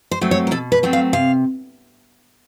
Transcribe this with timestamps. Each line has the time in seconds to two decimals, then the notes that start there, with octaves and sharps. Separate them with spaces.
0.11 C5
0.21 F#3 A3 C4
0.31 C#5
0.47 A#4
0.51 B2 A4
0.72 B4
0.83 F#3 A3 C4
0.93 F5
1.13 C3 F5